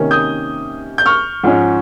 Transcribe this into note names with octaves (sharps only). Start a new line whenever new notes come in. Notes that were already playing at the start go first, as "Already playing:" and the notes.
Already playing: C3 D#3 A#3 C#4
D#6 G6
G6
C#6 F6
G#2 F3 G#3 C#4